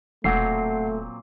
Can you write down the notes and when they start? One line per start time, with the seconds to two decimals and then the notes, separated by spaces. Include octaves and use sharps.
0.24 E1 A#2 F#3 A3 C4 F#5 C7